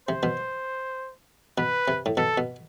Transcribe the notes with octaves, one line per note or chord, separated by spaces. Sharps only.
C3 C5
B2
B2 B4
C3
A2
B2 A4
B2